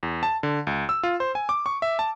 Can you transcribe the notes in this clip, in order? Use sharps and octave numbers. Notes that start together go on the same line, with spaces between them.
E2
A5
D3
C#2
E6
F4
C5
G#5
D6
C#6
E5
A5